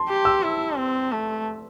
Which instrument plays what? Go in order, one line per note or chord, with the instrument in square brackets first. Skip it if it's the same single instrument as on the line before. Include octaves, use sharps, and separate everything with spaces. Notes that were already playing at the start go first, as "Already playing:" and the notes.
Already playing: [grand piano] A5 C6
[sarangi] G4
[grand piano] E6
[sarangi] E4
C4
A3